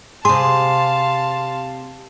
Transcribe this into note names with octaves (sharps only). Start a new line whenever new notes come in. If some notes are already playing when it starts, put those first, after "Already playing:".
C3 G#4 F5 A5 C6